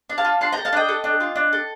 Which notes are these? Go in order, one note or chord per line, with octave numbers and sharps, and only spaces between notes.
D4
F5 A5
F4
D4 A5 C6
A4 G5 A#5
F5 A5
D4 D#5 G5
A4
D4
F4
D4
A4